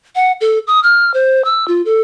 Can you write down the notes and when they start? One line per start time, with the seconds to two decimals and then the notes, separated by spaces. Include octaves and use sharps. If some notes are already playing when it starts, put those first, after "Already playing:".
0.15 F#5
0.41 A4
0.67 D#6
0.83 F6
1.14 C5
1.45 E6
1.68 F4
1.85 A4